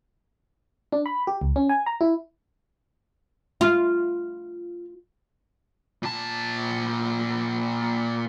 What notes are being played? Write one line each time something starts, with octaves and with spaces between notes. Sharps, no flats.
D4
B5
G4
C#2
C#4
G#5
A#5
E4
F4
A#2 A5